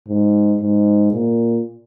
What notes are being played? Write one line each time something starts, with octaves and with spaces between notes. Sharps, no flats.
G#2
G#2
A#2